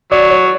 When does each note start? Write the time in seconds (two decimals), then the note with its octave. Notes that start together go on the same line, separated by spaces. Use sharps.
0.11 F#3 D5
0.31 C#5